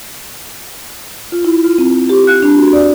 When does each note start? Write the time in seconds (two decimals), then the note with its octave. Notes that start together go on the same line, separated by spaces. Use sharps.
1.32 F4
1.45 E4
1.64 F4
1.78 C4
2.09 G4
2.27 F#6
2.42 D4
2.58 F#4
2.73 D5